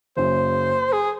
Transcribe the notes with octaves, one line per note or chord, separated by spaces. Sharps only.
F#1 F#2 C#3 C5
G#4